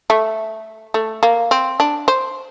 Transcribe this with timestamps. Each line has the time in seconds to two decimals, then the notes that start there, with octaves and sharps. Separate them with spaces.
0.10 A3
0.94 A3
1.23 A#3
1.51 C4
1.80 D4
2.08 C5